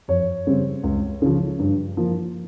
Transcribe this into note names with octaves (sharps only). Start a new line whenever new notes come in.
F2 C#5
C#3 G3 C4
C#2
C#3 F3
G2
F3 A#3